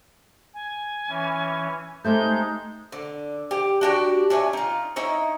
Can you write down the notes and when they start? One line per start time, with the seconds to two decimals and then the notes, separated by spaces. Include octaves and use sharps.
0.54 G#5
1.09 E3 C#4
2.04 G#3 A3 C4 D#4 G4 G6
2.92 D3
3.51 G4
3.81 D4 F#4 G4
4.30 D4 C#5 E5 G#5
4.53 D#4 F4
4.96 D#4 E4 C#5